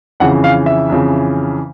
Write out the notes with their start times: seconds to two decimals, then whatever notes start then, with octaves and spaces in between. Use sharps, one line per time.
0.20 F2 C#3 E3 F#5
0.44 F5
0.66 E5
0.90 F2 C#3 E3